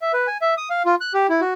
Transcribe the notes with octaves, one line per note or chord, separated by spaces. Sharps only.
E5
B4
G#5
E5
D#6
F5
F4
F#6
G4
E4
F#4